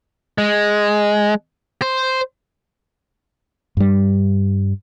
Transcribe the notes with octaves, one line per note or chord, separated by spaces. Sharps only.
G#3
C5
G2 G3